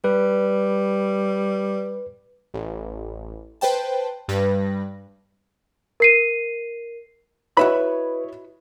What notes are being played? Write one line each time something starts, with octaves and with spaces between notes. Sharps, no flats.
G3 B4
A1
B4 C5 G5 A5
G2 G3 B4 A#6
A#4 C7 D#7
E4 F#4 B4 C#5 D#5 E5 B5